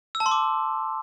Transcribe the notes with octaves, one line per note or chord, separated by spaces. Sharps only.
E6
A5
C6
D6